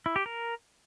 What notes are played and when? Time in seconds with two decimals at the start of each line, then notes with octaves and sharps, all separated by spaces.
0.06 E4
0.16 G4
0.26 A#4